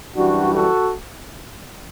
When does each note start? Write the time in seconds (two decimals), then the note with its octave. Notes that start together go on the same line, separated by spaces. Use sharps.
0.16 F#2 E3 G3 D4 F#4
0.54 F#4 A4